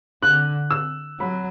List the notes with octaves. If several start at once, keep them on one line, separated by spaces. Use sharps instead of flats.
D3 F#6
E6
F#3 B5